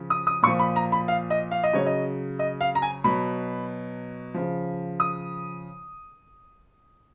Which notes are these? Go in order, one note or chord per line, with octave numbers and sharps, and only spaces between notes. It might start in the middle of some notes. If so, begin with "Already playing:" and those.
Already playing: C#3 F3
D#6
D#6
A#2 F3 C#6
B5
A#5
B5
F5
D#5
F5
D#5
C#3 F#3 C#5
D#5
D#5
F5
A#5
G#5
B2 F#3 B5
C#3 F3
D#6